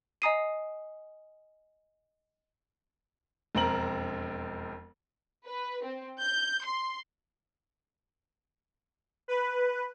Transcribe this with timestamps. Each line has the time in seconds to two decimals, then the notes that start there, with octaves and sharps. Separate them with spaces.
0.22 D#5 G#5 A#5 D#6 C7 D#7
3.55 E1 F2 C4 A#4 A#5 F#7
5.46 B4
5.84 C4
6.22 G6
6.65 C6
9.28 B4